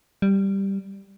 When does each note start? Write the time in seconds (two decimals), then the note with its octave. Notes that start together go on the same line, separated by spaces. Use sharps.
0.22 G3